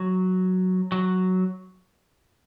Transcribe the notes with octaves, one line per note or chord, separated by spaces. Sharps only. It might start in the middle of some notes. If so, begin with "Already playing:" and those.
Already playing: F#3
F#3